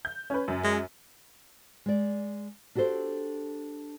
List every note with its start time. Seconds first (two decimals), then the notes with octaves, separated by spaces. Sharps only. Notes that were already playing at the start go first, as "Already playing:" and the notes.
0.05 G6
0.30 C#4 B4
0.48 F#2
0.64 G#3
1.86 G#3 D5
2.75 D4 F#4 G4 A4 C5